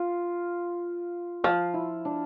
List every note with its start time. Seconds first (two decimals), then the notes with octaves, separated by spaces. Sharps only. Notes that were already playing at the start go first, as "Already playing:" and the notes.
Already playing: F4
1.44 F3 F4
1.74 E4
2.05 D4